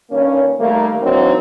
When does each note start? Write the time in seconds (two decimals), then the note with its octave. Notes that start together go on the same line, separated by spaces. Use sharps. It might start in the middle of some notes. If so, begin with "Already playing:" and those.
0.10 G2 D#3 A#3 C#4
0.59 D#3 G3 A3 A#3
1.02 E3 F#3 A#3 C4 D4 D#4